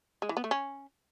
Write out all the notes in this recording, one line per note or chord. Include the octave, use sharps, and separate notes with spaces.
G#3
E3
B3
A3
C#4